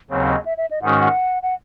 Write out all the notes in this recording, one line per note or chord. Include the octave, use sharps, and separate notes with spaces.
D#2 C#3 F#3 C4 C#5
D#5
E5
E5
D#5
G#2 D#3 G#3 C#4 F#4 F#5
F#5
F#5